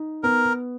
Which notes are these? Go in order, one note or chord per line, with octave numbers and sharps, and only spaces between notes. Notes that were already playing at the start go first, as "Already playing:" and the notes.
Already playing: D#4
B3 A#4